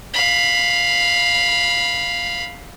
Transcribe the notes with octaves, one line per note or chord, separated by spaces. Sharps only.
F5 B5